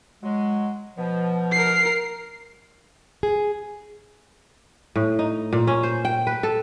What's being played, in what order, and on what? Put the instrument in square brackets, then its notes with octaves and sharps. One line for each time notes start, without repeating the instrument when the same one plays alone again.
[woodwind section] F#3 G#3
B2 F3
[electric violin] A#4 C7
[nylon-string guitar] G#4
[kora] A2
D#4
A#2
C#4
C5
G5
B4
A4